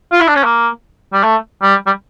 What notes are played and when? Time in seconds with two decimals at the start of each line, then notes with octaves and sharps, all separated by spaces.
0.12 F4
0.20 E4
0.28 D4
0.36 C#4
0.44 A#3
1.13 G3
1.24 A3
1.63 G3
1.86 G3